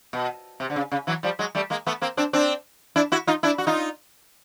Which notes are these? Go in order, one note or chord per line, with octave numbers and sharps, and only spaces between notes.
B2
C3
D3
C#3
C#3
E3 F#3
F3 G3
F#3 G#3
G3 A3
G#3 A#3
A3 B3
A#3 C4
C4 D4
C4 D4
D4 E4
E4 F#4
D#4 F4
D4 E4
F#4
D#4 F4